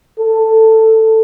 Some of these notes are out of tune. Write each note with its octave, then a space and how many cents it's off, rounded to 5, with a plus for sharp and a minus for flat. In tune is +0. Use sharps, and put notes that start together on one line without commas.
A4 +10